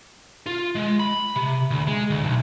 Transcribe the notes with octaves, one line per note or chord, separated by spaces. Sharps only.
F4
G#3
B5
C3
D2
G#3
D2
B1